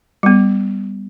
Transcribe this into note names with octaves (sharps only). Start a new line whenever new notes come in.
G3 B3